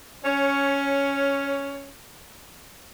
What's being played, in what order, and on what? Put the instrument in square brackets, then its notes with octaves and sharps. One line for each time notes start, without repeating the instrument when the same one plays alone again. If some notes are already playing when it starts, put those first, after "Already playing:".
[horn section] C#4 C#5